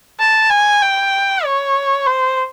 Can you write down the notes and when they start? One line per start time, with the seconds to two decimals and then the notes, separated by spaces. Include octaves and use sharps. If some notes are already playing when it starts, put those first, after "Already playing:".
0.19 A5
0.50 G#5
0.82 G5
1.45 C#5
2.06 C5